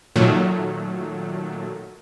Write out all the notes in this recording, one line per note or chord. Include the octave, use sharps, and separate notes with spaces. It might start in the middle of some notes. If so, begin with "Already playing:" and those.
A#2 D#3 F#3 A3